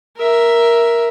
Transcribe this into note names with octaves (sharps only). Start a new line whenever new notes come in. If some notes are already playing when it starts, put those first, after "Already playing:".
A#4 E5